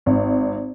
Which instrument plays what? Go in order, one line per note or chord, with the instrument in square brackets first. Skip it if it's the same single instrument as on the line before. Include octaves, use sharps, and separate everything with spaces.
[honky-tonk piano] G#1